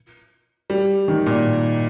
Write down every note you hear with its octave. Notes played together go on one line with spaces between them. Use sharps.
G3
D#3
A#2